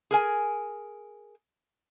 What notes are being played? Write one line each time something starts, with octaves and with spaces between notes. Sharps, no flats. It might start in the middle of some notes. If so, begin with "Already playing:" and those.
G#4 A#4 G#5